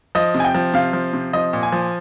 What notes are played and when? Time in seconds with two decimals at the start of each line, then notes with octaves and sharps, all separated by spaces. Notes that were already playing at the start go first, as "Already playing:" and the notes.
0.15 F3 D#5
0.35 C3
0.40 G#5
0.44 G5
0.55 F3
0.74 C3 F5
0.93 F3
1.13 C3
1.33 F3 D#5
1.53 A#2
1.63 G#5
1.72 F3